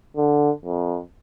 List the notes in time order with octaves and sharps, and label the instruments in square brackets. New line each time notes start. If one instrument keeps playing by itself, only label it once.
[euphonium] D3
F2